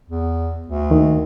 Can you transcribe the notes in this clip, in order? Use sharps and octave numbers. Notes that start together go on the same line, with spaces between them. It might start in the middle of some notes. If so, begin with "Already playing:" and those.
E2
D2
D#2 D#3